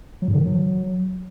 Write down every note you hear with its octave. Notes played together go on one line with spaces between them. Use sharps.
F#3
G#2
D3
D#3
F#3